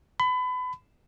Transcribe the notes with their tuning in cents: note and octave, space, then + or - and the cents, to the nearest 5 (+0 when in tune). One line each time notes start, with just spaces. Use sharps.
B5 +30